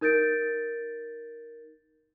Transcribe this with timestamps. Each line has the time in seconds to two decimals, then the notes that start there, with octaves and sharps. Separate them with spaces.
0.01 D#4 A#4 G6 A6 D7